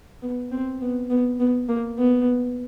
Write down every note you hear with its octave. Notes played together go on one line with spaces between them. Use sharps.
B3
C4
B3
B3
B3
A#3
B3